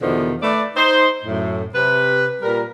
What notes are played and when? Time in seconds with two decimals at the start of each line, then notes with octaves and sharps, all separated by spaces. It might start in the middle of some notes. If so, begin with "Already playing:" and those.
0.01 E2 B2 D3 D#3 F3
0.42 A3 B4 D5
0.76 D#4 C5
1.23 F#2 A2
1.74 C3 B4
2.42 A#2 G3 A#4